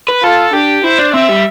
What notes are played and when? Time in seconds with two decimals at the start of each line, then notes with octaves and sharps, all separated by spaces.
0.09 B4
0.23 F4 A4
0.53 D4 G4
0.84 E4 C5
0.99 D4
1.14 C4 E5
1.29 G3